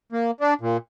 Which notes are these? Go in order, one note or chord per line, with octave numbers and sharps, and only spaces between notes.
A#3
D4
A#2